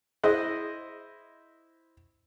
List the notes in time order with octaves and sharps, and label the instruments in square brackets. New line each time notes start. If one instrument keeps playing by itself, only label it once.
[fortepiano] E4 C5 D#5 [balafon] G#4